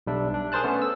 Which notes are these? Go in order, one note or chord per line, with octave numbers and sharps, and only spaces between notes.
B1 G3 D4 E5
D4
G#4 A#4 C5 A5 F#6
A3 B3 C#4
E6